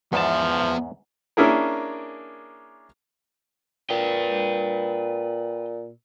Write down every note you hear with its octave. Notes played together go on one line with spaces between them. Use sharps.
E2 G#2 F3 B3 E5 A5
A#3 C#4 D4 E4 G#4 A#4
A#2 B4 G5